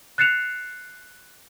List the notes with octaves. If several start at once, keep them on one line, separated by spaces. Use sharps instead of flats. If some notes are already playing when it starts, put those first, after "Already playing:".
F#6 A6 C7 C#7 E7 F7